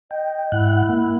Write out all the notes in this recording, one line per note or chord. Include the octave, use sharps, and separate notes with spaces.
D#5 G5
G#2 E4 F#5 F#6
A#3